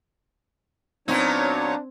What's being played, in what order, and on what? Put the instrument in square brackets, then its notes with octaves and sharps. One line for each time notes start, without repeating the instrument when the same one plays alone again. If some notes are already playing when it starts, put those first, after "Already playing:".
[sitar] A#2 D#4 [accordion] F#3 B3 C#5 [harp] C4 G#6 [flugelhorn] D4